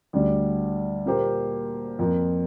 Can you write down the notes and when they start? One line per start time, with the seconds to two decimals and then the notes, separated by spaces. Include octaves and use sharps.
0.13 D2 D3 G3 D4
1.06 A#2 A#3 G4 C5
1.99 F2 F3 A#3